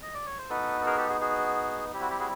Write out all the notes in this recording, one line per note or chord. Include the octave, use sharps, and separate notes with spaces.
D#5
D5
C#5
C5
B3 D#4 F#4 A4 B4
A4
G#4 A#4
G4 A4
F#4 G#4
F#4 G#4
G3 C4 E4 G4
F#4
G4
F#4 G#4